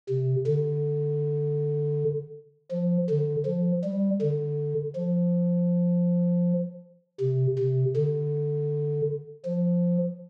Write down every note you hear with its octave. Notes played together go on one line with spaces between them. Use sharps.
C3
D3
F3
D3
F3
G3
D3
F3
C3
C3
D3
F3